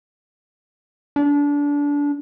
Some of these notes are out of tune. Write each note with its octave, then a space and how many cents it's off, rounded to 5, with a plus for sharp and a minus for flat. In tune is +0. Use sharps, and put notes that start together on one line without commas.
D4 -25